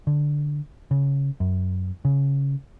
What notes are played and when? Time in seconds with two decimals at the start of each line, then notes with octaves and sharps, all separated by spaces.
0.07 D3
0.91 C#3
1.40 F#2
2.05 C#3